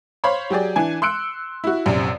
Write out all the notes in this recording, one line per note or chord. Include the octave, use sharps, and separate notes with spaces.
C5 C#5 F5 B5 C6
F#3 G4 G#4 D5
E3 D4 G#5
C6 E6 F#6 C#7 D7
E4 F#4
A#1 F#2 C3